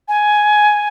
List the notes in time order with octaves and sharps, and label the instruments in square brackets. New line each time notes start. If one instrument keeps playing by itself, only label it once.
[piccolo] G#5